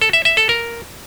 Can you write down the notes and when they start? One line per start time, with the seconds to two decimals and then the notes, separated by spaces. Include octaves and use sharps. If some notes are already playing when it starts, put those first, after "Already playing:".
0.01 A4
0.13 E5
0.25 E5
0.37 A4
0.49 A#4